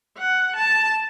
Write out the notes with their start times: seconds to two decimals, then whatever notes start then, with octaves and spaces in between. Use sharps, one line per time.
0.18 F#5
0.56 A5